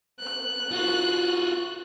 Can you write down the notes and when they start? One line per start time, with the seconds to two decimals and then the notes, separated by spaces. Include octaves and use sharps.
0.20 F#6
0.72 F4 F#4